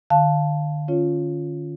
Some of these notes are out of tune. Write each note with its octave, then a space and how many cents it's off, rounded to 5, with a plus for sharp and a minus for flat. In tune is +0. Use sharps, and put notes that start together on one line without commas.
D3 +40 F5 +0 A5 +0
C#4 +0 F4 +0 C#5 +0